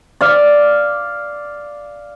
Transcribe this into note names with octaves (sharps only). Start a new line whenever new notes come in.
D5 F5